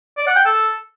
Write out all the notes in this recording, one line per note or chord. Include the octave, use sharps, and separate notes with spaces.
D5
F#5
G5
A4